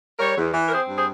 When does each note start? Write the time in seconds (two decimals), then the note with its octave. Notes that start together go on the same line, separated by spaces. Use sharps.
0.19 G3 A#4 C#5
0.37 E2
0.54 E3
0.67 A#4
0.71 C4 G#4 C5
0.89 G2
0.96 G#4 C5